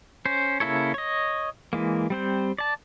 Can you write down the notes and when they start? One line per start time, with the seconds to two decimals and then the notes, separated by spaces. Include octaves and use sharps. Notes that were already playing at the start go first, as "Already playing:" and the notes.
0.26 C#4 C5
0.60 C#3 A#3 E4 A4 C#5
0.94 C#5 D#5
1.73 E3 G#3 A#3
2.10 G3 C4 C5
2.58 D5 A5